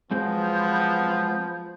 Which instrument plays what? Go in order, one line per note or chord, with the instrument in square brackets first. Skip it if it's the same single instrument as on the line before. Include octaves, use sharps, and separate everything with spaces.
[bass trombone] F3 [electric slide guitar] F#3 G#3 C4 [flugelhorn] B3 [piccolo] G6